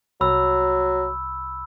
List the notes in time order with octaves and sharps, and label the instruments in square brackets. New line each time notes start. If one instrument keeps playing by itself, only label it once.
[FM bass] C2 [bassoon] F#3 [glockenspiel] B5 E6